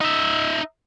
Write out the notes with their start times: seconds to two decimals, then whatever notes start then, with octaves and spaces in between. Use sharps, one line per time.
0.01 D#4 E5